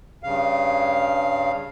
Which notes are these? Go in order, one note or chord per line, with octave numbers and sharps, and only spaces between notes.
G2 C#3 F5